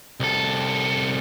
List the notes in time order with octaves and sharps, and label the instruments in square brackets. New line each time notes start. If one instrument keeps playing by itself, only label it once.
[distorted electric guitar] C2 A4